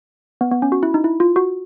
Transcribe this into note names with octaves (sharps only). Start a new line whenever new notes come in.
B3
B3
C#4
F#4
E4
D#4
E4
F4
F#4